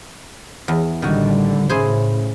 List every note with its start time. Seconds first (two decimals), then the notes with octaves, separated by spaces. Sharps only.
0.68 E2
1.02 A1 D3 D#3 G3 F#4
1.69 A2 C#3 E4 G#4 C5